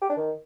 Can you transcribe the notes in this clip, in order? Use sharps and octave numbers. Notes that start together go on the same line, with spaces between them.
G4
D4
D#3